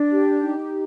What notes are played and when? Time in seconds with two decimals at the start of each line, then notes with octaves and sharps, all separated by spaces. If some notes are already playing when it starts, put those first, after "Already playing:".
Already playing: D4
0.10 G4
0.41 D#4